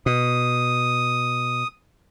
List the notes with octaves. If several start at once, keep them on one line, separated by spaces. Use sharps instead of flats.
B2 D#6